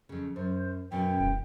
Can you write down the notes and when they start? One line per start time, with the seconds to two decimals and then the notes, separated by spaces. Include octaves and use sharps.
0.09 F2 C#3
0.36 F#2 C5
0.92 F#2 B2 C#4 G5
1.20 E1